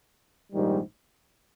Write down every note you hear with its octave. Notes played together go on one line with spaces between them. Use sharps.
A#1 G#2 D#3 G3